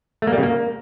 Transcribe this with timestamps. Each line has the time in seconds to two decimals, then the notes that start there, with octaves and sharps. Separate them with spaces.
0.22 A3
0.27 A#3
0.33 G3
0.38 C#3
0.43 A#3